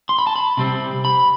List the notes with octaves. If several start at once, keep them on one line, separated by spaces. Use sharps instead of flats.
C6
B5
A5
B5
C3 G3 C4
B5